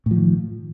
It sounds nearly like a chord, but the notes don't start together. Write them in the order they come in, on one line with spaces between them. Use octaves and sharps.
A2 F3 D#3